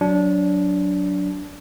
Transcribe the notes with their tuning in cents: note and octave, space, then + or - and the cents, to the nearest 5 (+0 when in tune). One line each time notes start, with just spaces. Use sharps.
F#3 +0 D4 -20